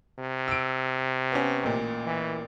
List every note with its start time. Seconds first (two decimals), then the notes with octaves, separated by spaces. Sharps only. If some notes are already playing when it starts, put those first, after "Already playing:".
0.18 C3
0.48 E6 D7
1.32 B3 C#4
1.63 A1 A#2
2.06 E3